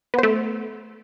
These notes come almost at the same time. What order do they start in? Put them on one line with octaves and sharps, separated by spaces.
B3 C5 A3